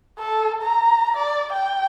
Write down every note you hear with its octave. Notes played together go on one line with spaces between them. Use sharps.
A4
A#5
D5
G5